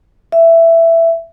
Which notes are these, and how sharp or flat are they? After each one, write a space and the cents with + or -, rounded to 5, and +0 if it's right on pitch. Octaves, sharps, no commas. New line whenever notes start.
E5 +10